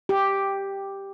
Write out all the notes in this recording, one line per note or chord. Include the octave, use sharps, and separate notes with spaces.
G4